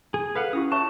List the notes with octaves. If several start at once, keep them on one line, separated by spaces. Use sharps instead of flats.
G#4
A4 B4 F5 F#5
C#4 E4 G4 D#6
C#5 E5 A5 C#6